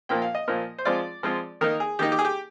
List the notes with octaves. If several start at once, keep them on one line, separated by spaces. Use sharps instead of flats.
A#2 F3 A#3 G5
F5
D#5
A#2 F3 A#3
C5
F3 G#3 C4 F4 D5
F3 G#3 C4 F4
D#3 A#3 D#4 A#4
G#4
D#3 A#3 D#4 G4
G4
G#4
G4